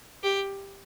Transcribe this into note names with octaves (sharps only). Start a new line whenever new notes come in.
G4